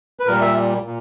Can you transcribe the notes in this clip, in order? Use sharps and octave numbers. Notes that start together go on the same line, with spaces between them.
B4
A#2 G3 A#4
E5
A#2